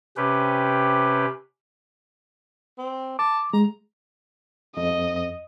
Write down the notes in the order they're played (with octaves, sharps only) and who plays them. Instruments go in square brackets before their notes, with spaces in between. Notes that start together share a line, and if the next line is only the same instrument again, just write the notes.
[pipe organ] C3 C#4 G4 B4
[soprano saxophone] C4
[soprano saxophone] A5 [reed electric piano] D6
[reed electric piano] G#3 [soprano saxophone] A#5
[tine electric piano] F2 [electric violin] D#5